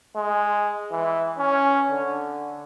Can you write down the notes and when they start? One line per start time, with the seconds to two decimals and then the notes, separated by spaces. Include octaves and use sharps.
0.16 G#3
0.92 E3
1.38 C#4
1.91 D3